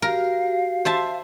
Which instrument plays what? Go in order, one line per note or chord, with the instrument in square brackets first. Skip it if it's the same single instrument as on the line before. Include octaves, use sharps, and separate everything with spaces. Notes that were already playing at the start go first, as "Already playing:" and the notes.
[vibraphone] F#4 G4 [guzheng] A#4 [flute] F5
[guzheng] C5 E5 A5